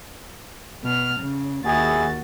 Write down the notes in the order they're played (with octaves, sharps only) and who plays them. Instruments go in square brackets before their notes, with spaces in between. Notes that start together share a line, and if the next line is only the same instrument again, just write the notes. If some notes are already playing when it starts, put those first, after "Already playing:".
[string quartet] B2 F6
C#3
[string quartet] D#2 F#4 A6 [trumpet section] E4 G#4